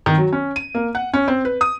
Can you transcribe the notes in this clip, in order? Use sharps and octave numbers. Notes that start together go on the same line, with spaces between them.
D#3
F#3
C#4
D#7
A#3
F#5
C#4
C4
B4
D#6